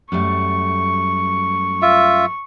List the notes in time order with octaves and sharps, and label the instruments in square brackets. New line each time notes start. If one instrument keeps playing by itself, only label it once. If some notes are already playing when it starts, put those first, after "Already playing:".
[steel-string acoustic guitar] F#2 G3 A3 [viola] C#6
[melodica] F4 E5